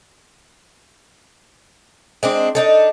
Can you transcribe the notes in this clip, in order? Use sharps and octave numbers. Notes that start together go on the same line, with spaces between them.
G#3 C4 D4
D4 D#4 A4